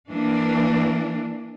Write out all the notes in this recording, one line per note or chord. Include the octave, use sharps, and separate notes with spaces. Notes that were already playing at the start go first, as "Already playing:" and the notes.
E3 A#3 D4